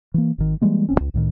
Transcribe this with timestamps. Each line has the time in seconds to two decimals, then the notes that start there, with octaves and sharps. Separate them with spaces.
0.14 E3 A#3
0.38 G#1 D#3
0.62 E3 G3 G#3 A#3
0.89 D#1 C4 C#4
1.00 C#2
1.14 C2 A2 D#3